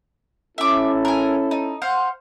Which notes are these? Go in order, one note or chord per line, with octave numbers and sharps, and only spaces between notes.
C#4 E4 A4 E5 D6
A#4 G#5
D#4
C5 F5 F#5